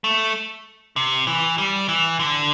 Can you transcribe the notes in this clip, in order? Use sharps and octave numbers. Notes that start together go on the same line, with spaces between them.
A3
C3
E3
G3
E3
D3